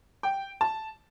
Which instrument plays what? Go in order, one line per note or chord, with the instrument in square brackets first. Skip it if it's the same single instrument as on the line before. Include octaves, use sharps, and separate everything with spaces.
[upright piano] G5
A5